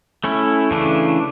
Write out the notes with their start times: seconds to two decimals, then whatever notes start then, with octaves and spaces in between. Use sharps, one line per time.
0.24 A3 C#4 E4
0.71 C#3 E3 A3 D4